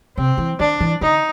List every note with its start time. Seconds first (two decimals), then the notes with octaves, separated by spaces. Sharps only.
0.17 C3 C4
0.38 E3
0.60 D#3 D4
0.80 E3
1.01 D3 D#4